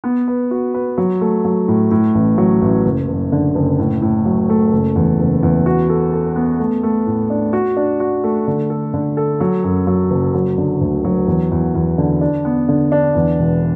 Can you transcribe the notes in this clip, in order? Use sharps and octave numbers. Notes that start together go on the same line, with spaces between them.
B3
B4
F#4
B4
F#3
A3
F#3
A2
A2
A1
F#3
A1
F#1
F#1
D3
F#1
A2
A2
F#3
A3
F#1
E2
F#1
E2
F#4
A4
A4
B3
A3
A3
A2
D4
F#4
D4
F#4
A3
D3
A4
D3
A4
F#3
F#2
F#3
F#1
F#3
D3
D2
F#3
E2
E2
E2
D3
D4
B3
D3
D4
E2
E1